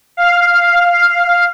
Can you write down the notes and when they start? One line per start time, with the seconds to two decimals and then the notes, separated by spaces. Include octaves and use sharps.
0.17 F5